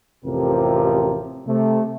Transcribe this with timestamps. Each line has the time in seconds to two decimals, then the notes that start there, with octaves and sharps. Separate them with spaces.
0.25 A1 F2 C3 F3 G4 A#4
1.47 C3 A3